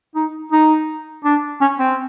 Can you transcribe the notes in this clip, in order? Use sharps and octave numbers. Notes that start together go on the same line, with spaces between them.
D#4
D#4
D4
C#4
C4